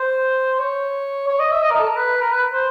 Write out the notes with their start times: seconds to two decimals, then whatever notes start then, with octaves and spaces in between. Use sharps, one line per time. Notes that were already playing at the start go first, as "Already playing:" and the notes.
Already playing: C5
0.59 C#5
1.28 C#5
1.39 D#5
1.51 E5
1.62 D#5
1.71 A#4
1.79 A4
1.87 A#4
1.96 B4
2.21 A#4
2.31 B4
2.53 C5